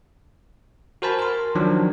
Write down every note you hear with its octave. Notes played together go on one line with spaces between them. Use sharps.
F#4 A#4 C5 G#5 A5 B5
A#4 C6
D#3 F3 F#3 D4